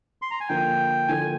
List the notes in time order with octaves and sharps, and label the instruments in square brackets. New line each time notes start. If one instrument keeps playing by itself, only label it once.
[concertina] C6
A#5
G#5
[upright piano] D3 F3 A#3 [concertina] G5
[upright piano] D3 F3 A#3 [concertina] G#5